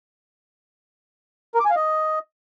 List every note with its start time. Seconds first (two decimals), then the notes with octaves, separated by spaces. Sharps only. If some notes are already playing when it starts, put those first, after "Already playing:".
1.55 A#4
1.60 D6
1.65 G#5
1.70 F5
1.76 D#5